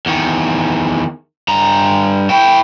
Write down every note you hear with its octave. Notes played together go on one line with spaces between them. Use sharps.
E2 D#3
G2 A#5
E4 G5